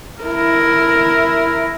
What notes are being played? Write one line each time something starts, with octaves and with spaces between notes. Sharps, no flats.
E4 A#4